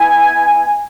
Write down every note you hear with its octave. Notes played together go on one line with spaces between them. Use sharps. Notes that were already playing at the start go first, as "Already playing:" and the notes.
Already playing: B3 E4 G#5